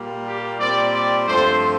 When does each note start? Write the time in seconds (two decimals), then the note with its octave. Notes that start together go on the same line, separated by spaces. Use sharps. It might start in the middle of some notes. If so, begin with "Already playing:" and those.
Already playing: A#2 G3 A#3
0.25 G4
0.58 A#2 G3 C4 D5
0.93 D5
1.26 G2 F3 A3 C4 C5